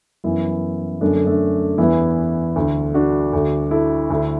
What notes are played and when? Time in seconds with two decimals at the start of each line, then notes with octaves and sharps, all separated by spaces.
0.24 F#2 E3 B3 E4
1.01 F#2 D3 A3 D4
1.14 A3
1.27 A3 D4
1.78 E2 E3 B3 E4
2.56 D2 D3
2.94 D4 F#4
3.33 D2 D3
3.71 E4 A4
4.10 D2 D3